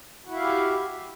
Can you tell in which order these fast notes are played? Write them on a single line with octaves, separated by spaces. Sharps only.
F#4 E4 E5 F5 G4